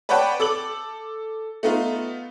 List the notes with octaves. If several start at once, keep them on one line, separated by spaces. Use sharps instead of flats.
B4 C#5 D5 F#5 G5 A5
A4 D6 F#7
A3 B3 D#4 F4